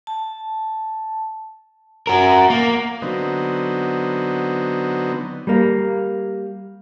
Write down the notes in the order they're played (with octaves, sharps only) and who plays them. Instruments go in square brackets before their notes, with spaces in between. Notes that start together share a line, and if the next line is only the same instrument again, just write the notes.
[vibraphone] A5
[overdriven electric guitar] F#4 A#4
A#3
[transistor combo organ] D3 F#3 B3 C4 D#4
[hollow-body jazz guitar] G3 A#3